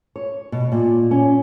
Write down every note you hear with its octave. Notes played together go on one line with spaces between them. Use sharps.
C#5
B2
A#2
C#4